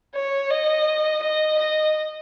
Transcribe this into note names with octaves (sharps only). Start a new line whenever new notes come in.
C#5
D#5
D#5
D#5